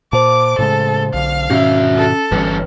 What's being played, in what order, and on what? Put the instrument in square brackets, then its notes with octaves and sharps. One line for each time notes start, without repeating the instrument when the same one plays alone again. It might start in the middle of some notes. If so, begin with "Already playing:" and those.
[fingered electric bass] A#2 [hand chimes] C5 A5 [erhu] D6
[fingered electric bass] A2 C#3 G#3 [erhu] A4
[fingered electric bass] B1 D3 [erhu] F5
[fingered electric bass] G#2 B2 D#3 [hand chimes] C#4 [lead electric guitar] F#4 E5
[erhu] A4
[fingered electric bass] G1 E3 [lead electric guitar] G2 C#4 [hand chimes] B4